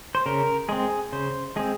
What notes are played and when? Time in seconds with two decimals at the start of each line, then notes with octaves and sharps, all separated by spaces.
0.15 C5
0.26 C#3 A#4
0.69 G#3 C4 G#4
1.12 C#3 C5
1.56 G#3 C4 G#4